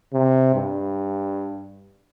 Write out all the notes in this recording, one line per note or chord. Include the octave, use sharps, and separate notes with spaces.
C3
G2